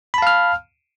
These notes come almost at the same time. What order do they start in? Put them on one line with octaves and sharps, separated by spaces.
B5 A5 F5 F6